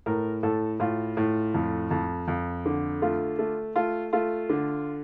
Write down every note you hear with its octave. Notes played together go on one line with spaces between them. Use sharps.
A2 A#4
A2 A4
A2 F4
A2
F2
F2
F2
D3
A3 F4
A3
A3 F4
A3 F4
D3